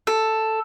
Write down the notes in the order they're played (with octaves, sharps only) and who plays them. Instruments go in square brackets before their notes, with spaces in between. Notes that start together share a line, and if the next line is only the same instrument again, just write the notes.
[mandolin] A4